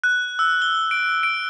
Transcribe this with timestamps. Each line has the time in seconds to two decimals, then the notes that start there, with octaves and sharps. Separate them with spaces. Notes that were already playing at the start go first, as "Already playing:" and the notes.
0.04 F#6
0.39 E6
0.62 G7
0.91 D7
1.23 D7